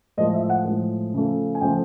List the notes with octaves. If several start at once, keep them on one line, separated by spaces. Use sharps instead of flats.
A2 F3 G#3 D#5
E5
F#5
A2 F3 G#3
C#3 F3 A3
G#5
C#3 F3 A3 G5